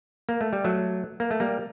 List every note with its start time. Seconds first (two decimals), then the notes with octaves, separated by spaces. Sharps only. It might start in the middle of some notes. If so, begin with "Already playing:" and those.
0.29 A#3
0.41 A3
0.53 G3
0.64 F#3 A3
1.20 A#3
1.31 A3
1.40 G3 A#3